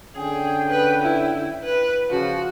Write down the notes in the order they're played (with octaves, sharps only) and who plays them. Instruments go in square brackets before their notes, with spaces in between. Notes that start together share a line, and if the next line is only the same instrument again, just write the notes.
[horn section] D3 C#4 G5 [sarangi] G#4
[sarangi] B4
E4
B4
[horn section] C#3 F3 [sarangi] F#4